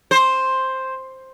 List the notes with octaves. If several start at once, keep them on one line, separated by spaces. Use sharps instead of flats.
C5